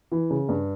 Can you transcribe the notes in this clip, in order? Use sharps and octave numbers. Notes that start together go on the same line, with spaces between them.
E3
C#3
G2